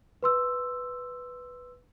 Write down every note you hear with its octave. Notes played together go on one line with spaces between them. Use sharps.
B4 C6 E6